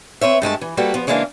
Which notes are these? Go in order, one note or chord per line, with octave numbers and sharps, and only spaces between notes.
C4 B4 C#5 E5
G2 G#3 A3 A5
E3
G3 A#3 F#4 A4 B4
F3 B3
C#3 E3 G#3 A#3 D4 F5